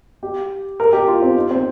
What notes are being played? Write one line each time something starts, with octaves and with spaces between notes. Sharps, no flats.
G4
A#4
G4
F4
C4
D#4
C4